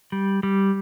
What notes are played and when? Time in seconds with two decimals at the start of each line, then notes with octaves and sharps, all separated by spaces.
0.12 G3
0.43 G3